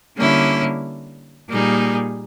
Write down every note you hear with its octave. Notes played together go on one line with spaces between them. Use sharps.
D3 G3 A#3 C#4 E4
A#2 G3 A#3 D#4 G#4